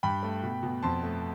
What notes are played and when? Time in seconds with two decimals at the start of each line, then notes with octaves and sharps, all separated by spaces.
0.03 G2 G5 B5
0.23 A3
0.43 B2
0.63 B2
0.82 F2 A5 C6
1.03 A3